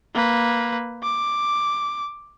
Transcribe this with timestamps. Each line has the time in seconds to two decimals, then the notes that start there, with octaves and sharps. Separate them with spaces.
0.14 A#3 B4
1.03 D6